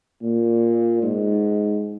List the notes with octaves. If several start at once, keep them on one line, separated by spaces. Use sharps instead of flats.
A#2
G#2